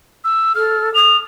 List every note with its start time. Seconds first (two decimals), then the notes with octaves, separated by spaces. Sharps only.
0.24 E6
0.55 A4 F6
0.95 D#6 F7